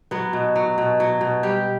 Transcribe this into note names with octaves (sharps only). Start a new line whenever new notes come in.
F#3 B3
B2
F#3
B2
F#3
B2
G3 G4